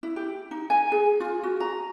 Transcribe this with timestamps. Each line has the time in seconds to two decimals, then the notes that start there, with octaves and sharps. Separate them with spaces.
0.03 E4
0.16 G4
0.51 D#4
0.70 G#5
0.92 G#4
1.20 F4
1.43 F#4
1.60 A#5